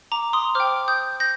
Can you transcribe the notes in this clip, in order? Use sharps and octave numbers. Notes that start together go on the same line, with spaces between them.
A#5 D6
C6 D#6
C5 G5 D6 F6
D#6 G6
G6 A#6